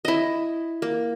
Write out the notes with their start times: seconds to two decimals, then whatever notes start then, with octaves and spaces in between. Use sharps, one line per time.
0.05 E4 D#5
0.82 A#3